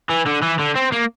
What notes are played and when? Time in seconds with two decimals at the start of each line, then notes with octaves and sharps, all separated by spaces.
0.09 E3
0.26 D3
0.42 E3
0.59 D3
0.75 C4
0.92 A#3